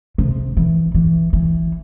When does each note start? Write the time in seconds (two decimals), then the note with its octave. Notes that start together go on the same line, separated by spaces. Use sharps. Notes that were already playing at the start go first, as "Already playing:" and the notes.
0.18 C3
0.57 E3
0.95 E3
1.33 E3